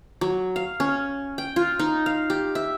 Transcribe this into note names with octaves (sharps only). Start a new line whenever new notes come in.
F#3
F5
C#4
G5
F4
D#4
F5
G4
E5